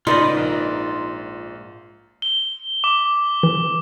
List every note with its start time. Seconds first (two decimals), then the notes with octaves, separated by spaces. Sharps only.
0.07 G#2 C#3 D#4 F4 A#4 B4 D5 D#5
0.37 A#1
2.22 G7
2.84 D6
3.43 E3